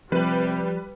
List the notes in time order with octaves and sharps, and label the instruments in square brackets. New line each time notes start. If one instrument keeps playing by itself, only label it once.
[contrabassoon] C3 [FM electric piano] F3 [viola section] G3 [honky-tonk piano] B4 F#7